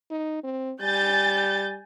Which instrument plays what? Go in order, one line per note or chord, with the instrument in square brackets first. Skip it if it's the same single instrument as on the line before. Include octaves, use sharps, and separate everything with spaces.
[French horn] D#4
C4
[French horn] G3 [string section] G#5 G6 A6